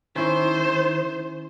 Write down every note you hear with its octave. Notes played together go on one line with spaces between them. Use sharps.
D#3 C#4 E4 C5